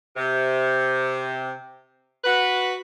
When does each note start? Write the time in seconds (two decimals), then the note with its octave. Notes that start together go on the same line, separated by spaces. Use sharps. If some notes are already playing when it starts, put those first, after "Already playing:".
0.17 C3
2.24 F#4 B4